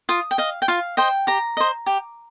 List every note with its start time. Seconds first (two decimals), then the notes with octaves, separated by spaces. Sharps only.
0.09 F4 D#6
0.31 G5
0.38 D#5 F5
0.62 G5
0.68 F4 F5
0.97 C5 D#5 G5
1.27 G4 A#5
1.57 C5 D#5
1.86 G4